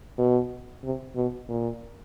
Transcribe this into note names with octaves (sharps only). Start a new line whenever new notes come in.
B2
C3
B2
A#2